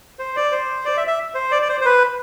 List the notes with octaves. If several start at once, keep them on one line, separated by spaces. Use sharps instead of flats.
C5
D5
C5
D5
E5
E5
C5
D5
D5
C5
C5
B4